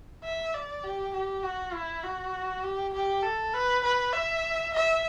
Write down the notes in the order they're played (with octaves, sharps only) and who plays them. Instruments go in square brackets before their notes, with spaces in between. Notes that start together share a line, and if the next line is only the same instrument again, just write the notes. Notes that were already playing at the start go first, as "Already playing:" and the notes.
[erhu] E5
D5
G4
G4
F#4
E4
F#4
G4
G4
A4
B4
B4
E5
E5